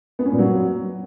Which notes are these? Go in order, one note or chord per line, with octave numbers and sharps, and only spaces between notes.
B3
C#4
A#2
F#3